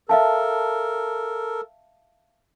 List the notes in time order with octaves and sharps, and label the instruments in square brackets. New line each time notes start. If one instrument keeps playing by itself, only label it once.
[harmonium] A4 A#4 [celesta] E5 F5 A5